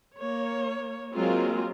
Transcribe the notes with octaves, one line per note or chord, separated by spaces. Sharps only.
A#3 C#5
F#3 G#3 A#3 C4 F4 A#4